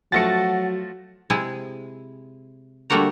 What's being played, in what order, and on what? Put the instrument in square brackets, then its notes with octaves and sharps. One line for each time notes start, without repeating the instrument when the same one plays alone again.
[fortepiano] F3 A3 F#4 [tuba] F#3 [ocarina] F#5 [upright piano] A6 A#6 C#7
[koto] C3 G#3 E4 G#4
D3 G3 A3 A#3 F#4 A#5